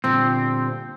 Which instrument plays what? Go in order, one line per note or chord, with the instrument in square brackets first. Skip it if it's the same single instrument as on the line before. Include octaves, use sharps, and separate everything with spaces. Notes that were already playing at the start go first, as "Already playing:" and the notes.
[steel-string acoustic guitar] A#2 D3 G3 [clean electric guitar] C4